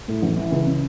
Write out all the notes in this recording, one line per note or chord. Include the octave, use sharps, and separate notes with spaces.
A2
A1
E3
C#2
C#3